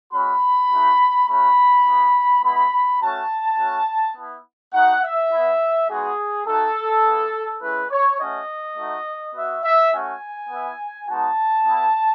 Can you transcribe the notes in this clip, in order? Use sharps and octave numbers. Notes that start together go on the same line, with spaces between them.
G#3 C#4 F#4 B5
A3 D#4 F#4
A3 C#4 F#4 B5
B3 E4
G#3 B3 E4 B5
A3 C#4 F#4 A5
A3 C#4 F#4
B3 E4
A3 D#4 F#4 F#5
E5
B3 E4
G#3 B3 D#4 F#4 G#4
A3 D#4 F#4 A4
B3 E4
G#3 C#4 E4 B4
C#5
A3 C#4 F#4 D#5
A3 D#4 F#4
B3 F#4 E5
E5
A3 C#4 F#4 G#5
B3 E4
G#3 B3 D#4 F#4 A5
B3 E4